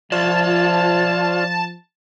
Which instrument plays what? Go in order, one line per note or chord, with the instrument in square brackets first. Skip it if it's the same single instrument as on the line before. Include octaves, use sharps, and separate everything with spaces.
[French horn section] F3 [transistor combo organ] F4 [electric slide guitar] C5 D5 [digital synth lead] A5